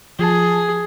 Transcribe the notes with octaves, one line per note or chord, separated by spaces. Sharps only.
F3 G#4 A5